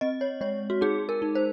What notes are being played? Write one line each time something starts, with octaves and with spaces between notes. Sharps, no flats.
C4 D#5
C#5
G#3 C#5
F#4
D#4 G#4
A#4
D#4
C5